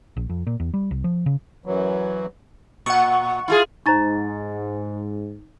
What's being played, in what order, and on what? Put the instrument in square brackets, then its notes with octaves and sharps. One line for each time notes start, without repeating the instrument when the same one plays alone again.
[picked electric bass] A#1
F2
A#2
E2
G3
C2
F3
C#3
[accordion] F#2 E3 F#3
[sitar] A#2 [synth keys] F#5 C#6
[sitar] E4 F4 G#4
[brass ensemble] G#2 [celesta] D#4 A6 [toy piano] C5 A#5 C#6